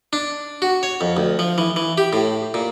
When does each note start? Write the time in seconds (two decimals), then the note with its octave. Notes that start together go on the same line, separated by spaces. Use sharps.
0.13 D4
0.62 F#4
0.83 C#5
1.01 F2
1.17 D2
1.39 F3
1.58 E3
1.76 E3
1.98 G4
2.13 A2
2.54 A#2